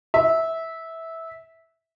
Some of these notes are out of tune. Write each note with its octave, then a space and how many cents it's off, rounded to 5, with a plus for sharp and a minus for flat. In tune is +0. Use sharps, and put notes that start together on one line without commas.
E5 -15